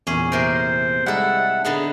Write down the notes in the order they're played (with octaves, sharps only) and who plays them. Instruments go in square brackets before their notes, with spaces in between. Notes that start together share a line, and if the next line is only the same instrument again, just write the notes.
[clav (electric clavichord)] E2 A#2 [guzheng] C#4 G#4
[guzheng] C3 A#4 [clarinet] C5
[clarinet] C5
[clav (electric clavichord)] G3 G#3 D#4 [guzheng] E4 A4 [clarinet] F#5
[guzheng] D3 B3 D#4 [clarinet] G#4